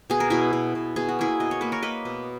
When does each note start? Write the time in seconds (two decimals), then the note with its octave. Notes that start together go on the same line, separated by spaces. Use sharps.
0.10 B2 G#4
0.20 A#4
0.30 B2 E4 G#4
0.53 B2
0.75 B2
0.96 B2 G#4
1.09 F#4
1.19 A#3 E4 G#4
1.40 B2 D#5
1.51 C#5
1.61 A#3 B4
1.72 A#4 C#5
1.82 A#3 B4 D#5
2.05 B2